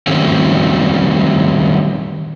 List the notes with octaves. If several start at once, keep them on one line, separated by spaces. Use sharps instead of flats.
D#3 F#3 G3 A3 C4 C#4